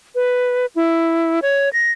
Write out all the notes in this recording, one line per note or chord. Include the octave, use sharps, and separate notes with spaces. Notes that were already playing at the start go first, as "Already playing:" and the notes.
B4
E4
C#5
A#6